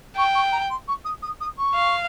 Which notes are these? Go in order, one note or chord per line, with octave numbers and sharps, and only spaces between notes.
G5 C#6
C#6
A#5
C6
C#6
D#6
D#6
D#6
C#6
F5